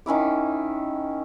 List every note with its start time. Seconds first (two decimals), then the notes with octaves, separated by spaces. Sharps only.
0.06 D#3 C#4 E4 D6